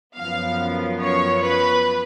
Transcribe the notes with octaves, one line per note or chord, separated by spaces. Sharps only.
F#2 F3 B3 F5
C#5
B4